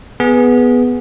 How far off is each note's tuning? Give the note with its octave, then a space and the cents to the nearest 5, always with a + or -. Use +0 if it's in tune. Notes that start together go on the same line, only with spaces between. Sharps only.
B3 +0 G#4 +5